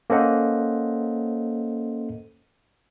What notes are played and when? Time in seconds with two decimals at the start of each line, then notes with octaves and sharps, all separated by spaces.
0.10 A#3 C#4 A4 C5 D#5 F#5